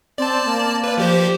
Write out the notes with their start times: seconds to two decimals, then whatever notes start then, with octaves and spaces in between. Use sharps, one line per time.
0.18 C4 D5 A5
0.46 A#3
0.84 B4 D5
0.98 F3 G4 C5